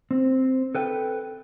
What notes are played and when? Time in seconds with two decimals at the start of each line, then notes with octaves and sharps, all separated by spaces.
0.11 C4
0.75 A4 B4 G5